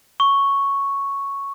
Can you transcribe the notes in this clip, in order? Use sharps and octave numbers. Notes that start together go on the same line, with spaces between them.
C#6